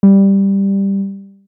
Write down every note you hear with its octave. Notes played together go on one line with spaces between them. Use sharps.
G3